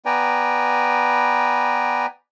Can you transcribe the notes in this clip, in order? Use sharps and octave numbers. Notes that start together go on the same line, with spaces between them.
B3 B4 D5 G5 G#5 A#5